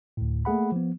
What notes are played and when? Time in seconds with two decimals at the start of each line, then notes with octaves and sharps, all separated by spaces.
0.17 D2 A2
0.45 A3 A#3 G#4 F#5 B5
0.72 F3 B3